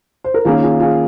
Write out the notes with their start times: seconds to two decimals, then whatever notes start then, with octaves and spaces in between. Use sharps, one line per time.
0.24 C5
0.34 A#4
0.45 D#3 A#3 C#4 F4 G#4
0.63 F4 G#4
0.80 F4 G#4